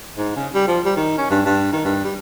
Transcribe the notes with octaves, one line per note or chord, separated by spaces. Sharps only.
G#2
C#3
G3
F3
G3
D#3
C#4
G2
G2
D#3
G2
G3